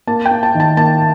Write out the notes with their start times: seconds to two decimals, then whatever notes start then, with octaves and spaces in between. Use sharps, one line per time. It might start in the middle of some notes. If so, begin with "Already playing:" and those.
0.07 A#3 A5
0.26 G5
0.31 A#3
0.43 A5
0.55 D#3
0.60 A5
0.77 A#3 A5